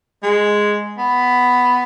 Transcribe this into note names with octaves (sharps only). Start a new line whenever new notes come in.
G#3
B3